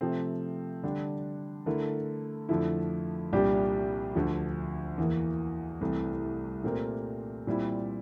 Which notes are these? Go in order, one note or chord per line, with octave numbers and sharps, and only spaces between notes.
C3 F3 A3 C4
D3 G3 D4
D3 A3 E4 A#4
F2 D3 F3 A3 E4
C2 A#2 G3 D4 G4
D2 D3 F3
E2 E3 A#3
C2 C3 E3 A3
A#2 A3 C4 G4 A#4
A#2 G3 C4 E4